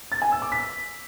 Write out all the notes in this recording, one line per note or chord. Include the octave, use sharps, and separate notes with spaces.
A6
G#5
E6
D6
B6